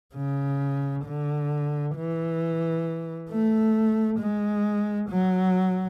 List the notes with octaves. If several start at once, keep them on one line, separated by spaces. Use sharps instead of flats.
C#3
D3
E3
A3
G#3
F#3